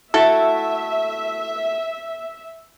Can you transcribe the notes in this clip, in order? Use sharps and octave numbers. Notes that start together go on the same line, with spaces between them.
A3 E4 F#4 A4 E5